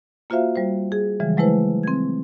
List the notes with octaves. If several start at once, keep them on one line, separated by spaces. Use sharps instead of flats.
A#3 F4 F#4 C5 E5 F5
G3 C5
G#4
C#3 E3 F3 G3 G#3
F#3 G#3 A3 E4 B4 C5
C4 G#6